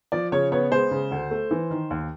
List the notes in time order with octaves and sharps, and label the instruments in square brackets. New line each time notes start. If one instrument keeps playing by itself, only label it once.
[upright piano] F3 D5
C#3 C#5
B3 C#5
G#3 C5
C#3
D2
A3
E3
D#3
D#2